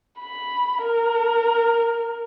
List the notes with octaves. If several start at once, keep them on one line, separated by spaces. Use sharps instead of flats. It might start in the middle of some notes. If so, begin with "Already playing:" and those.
B5
A#4